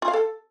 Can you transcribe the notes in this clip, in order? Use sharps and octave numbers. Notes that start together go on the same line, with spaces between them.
F4
F5
A4